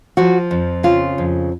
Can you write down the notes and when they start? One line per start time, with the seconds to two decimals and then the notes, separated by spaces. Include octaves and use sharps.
0.17 F3 F#4
0.51 F2
0.83 C#3 F4
1.18 F2